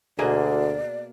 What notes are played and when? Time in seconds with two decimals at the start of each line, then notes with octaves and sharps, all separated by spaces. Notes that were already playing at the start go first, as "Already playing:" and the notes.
0.19 D2 B2 A#3 G#4 D5